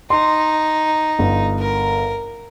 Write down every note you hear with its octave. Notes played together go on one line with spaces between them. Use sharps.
D#4 C6
G1
A#4